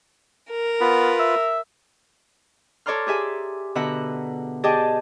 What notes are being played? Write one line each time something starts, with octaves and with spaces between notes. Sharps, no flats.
A#4
B3 F4 B4
E5
A4 C#5 D5 A#5 C6 F6
G4 G#4 E5 G#5
B2 D3 E5 F#5 A#5
G4 G#4 D5 D#5 G5 A5